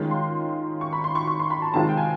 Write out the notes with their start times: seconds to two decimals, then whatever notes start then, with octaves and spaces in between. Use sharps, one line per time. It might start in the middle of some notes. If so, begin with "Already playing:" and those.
Already playing: D#3 G#3 C#4 F4
0.11 C6
0.81 C#6
0.93 B5
1.04 C6
1.15 C#6
1.27 C#6
1.40 C6
1.50 B5
1.62 A5
1.74 C3 D#3 G#3 C4 F4 A5
1.89 G5
1.97 G#5